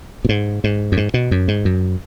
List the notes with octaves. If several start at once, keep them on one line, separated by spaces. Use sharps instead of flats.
B2
G#2
G#2
F#2
G#2
B2
F#2
G#2
F#2